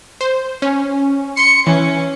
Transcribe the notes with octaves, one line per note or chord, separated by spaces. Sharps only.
C5
C#4
C6 C#7
E3 C#4